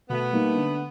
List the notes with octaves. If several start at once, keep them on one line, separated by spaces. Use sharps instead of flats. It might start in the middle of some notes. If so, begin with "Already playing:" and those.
B2 A3 B3
G3 A#3 D#4
D3